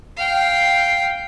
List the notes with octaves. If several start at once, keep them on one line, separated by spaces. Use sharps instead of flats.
F5 G5